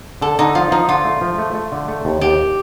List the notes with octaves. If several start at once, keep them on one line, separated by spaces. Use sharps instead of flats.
D3 A4
D3 D#4
F3 F4
F3 D#4
D3 F4
A3
F3
A3
A3
D3
A3
D#2
D#2 G4